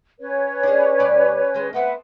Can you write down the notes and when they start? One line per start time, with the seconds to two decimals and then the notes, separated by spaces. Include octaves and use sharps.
0.20 C#4 B4 C#5
0.63 D4 G#4
1.00 B2 G3 D5
1.54 D#3 G#3
1.73 A3 B3 C4 B4 E5 F#5